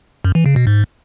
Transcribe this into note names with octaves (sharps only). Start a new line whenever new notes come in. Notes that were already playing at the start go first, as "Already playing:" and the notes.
F#2
E3
C#3
B2
G#2